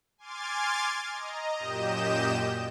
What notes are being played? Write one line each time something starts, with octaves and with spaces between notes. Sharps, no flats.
G#5 C6 D6 F6 G#6 A6
D#5 A#5
F#2 A#2 G4 D#5 G6 E7